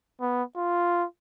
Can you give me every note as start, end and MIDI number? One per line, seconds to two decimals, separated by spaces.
0.21 0.43 59
0.56 1.05 65